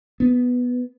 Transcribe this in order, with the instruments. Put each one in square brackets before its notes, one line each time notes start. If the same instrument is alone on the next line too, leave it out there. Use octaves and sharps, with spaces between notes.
[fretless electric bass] B3